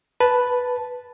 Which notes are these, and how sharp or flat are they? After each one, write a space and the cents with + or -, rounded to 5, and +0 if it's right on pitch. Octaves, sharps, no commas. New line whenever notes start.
B4 +0 A5 -5